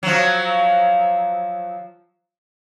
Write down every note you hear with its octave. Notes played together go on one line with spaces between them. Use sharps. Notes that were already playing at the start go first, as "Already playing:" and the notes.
F3 F#3